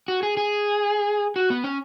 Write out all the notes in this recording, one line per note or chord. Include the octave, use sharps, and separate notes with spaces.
F#4
G#4
G#4
F#4
B3
C#4